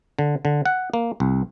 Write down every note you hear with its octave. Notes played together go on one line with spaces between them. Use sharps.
D3
D3
F#5
A#3
C2